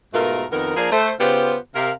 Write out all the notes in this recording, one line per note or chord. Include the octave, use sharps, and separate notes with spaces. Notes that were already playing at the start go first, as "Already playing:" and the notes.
G#2 B2 A3 F4 A#4
F2 D#3 B3 A#4
F3 A#3 D4 G#4 A#4
A3 C5
C#3 B3 F4 G4 B4 C5
C3 A#4 F5